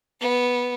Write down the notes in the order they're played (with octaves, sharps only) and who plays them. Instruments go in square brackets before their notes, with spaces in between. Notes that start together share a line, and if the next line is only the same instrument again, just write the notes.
[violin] B3